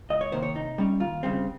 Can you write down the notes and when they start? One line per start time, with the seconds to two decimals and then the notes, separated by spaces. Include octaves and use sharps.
0.10 C#2 D#5
0.21 C#5
0.32 C3 D#3 A#3 C5
0.42 C#5
0.55 C3 D#4
0.78 G3 C#4
1.00 D#2 F4
1.23 C#3 G3 C4